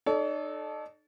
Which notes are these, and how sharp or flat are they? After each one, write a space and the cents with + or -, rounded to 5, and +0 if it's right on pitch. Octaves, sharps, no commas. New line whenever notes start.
D#4 -35 A4 -15 C#5 +40